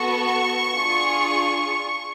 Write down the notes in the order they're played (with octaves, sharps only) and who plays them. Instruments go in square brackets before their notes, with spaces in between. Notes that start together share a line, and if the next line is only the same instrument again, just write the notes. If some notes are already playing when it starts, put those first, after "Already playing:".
Already playing: [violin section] B3 F#4 A4 C#6
D4 F4 G#4